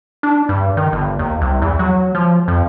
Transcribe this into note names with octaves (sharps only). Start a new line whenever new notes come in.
D4
G2
D#3
G1
D#2
C2
E2
F#3
F3
F2